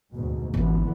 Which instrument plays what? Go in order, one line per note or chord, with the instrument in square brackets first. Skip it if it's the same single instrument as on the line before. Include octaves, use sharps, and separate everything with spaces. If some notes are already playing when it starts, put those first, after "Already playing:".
[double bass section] D2 G#2 B2
[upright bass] G#1 G#2 [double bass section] D3 E3 B3